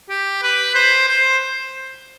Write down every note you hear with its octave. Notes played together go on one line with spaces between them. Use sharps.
G4
B4
C5
C5